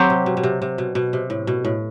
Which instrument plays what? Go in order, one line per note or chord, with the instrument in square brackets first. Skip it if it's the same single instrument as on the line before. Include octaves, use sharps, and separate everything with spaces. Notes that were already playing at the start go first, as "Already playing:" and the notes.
Already playing: [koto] F#3 C4 G4
[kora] C3
B2
B2
C3
C3
B2
B2
C3
A2
B2
A2